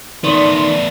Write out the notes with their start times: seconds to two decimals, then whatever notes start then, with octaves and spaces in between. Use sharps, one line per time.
0.24 D#3 A3 B3 D5 C6